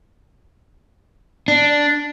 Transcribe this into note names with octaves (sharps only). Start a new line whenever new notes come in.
D4